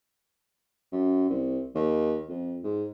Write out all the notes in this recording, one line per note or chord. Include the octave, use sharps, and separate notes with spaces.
F#2
C2
D#2
F2
G#2